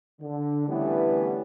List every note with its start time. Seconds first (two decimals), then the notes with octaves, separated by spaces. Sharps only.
0.21 D3
0.68 D3 E3 G3 A3 B3 C#4